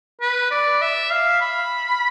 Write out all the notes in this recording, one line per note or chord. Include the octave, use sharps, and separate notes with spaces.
B4
D5
E5
F5
B5